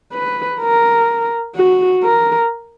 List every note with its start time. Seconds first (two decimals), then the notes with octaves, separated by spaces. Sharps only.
0.13 B4
0.60 A#4
1.56 F#4
2.03 A#4